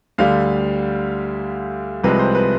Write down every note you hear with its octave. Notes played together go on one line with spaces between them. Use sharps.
D2 D3 G3 F5
C2 C3 F3 G#3 B4
C5
B4